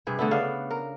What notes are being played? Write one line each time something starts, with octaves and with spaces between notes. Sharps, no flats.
G2 C3 G#4 B4
D3 A3 B3 E4
C#3 B3 D4 F5
A#4